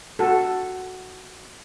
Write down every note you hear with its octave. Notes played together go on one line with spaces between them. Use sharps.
F#4 A4